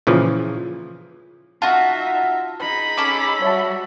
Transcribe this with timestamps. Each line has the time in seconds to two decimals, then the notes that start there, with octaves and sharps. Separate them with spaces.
0.07 A#2 C#3 E3 F3
1.62 D#4 F4 F#4 E5 A5
2.61 D#4 G#4 B5
2.97 C#4 A4 D6
3.42 G3 F#4 C#5 E5 A5